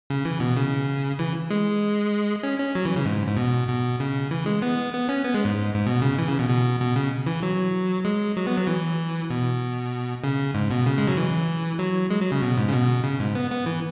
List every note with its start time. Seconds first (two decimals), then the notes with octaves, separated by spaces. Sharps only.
0.10 C#3
0.25 E3
0.40 B2
0.57 C#3
1.19 E3
1.50 G#3
2.43 C#4
2.60 C#4
2.75 F#3
2.85 E3
2.96 C#3
3.06 G#2
3.28 G#2
3.37 B2
3.68 B2
4.00 C#3
4.31 E3
4.46 G#3
4.62 B3
4.93 B3
5.09 C#4
5.24 B3
5.35 G#3
5.45 G#2
5.75 G#2
5.87 B2
6.02 C#3
6.18 E3
6.28 C#3
6.39 B2
6.50 B2
6.80 B2
6.96 C#3
7.27 E3
7.43 F#3
8.05 G#3
8.37 F#3
8.47 B3
8.57 F#3
8.67 E3
9.30 B2
10.24 C#3
10.54 G#2
10.71 B2
10.86 C#3
10.98 G#3
11.07 F#3
11.17 E3
11.79 F#3
12.10 G#3
12.21 F#3
12.32 C#3
12.42 B2
12.57 G#2
12.69 C#3
12.73 B2
13.04 C#3
13.20 G#2
13.35 B3
13.51 B3
13.66 E3